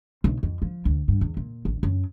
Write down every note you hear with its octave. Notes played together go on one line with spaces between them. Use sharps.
B1
F2
F3
D2
G2
E2
A#2
A1
F#2